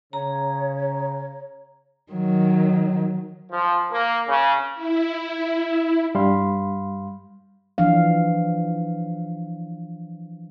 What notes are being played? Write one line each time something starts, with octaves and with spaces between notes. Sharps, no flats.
C#3 C#5 A#5
D#3 F#3
F3
A#3
C#3
E4
G2 G3 F5 B5 C6
E3 F3 D4 F5